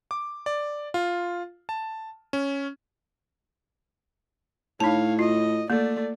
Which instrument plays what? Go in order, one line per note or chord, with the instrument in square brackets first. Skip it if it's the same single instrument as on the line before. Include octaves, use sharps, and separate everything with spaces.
[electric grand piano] D6
D5
F4
A5
C#4
[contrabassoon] A2 [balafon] D#4 A5 [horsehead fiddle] C#5 F5
[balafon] F4 [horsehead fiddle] D#5
[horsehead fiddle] A3 D5 [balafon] A#3